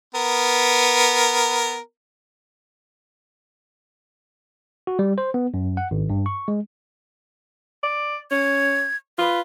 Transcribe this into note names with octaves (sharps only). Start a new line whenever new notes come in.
B3 A#4
F#4
G3
C5
B3
F#2
F#5
G#1
G2
C#6
G#3
D5
C#4 G#6
F4 B4